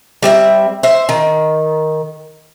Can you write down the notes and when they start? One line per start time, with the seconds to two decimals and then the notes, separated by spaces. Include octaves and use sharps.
0.23 G3 C4 D#5 E5
0.83 C5 E5
1.09 D#3